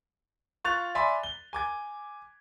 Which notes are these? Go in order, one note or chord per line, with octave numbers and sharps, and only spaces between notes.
F4 C#6 F#6 A6 F7
D5 E5 G#5 B5 C6
G7
G#5 D6 G#6